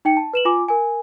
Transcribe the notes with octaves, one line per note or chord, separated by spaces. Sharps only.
D#4 G5 C#7
A5
B4 E7 F#7
F4 G#5 D6
A#4 G#5